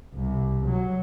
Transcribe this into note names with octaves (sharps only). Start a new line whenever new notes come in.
C2
F#3